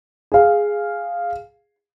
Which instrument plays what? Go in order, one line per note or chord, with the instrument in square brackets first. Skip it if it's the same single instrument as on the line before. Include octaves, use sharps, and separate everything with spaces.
[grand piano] G#4 F5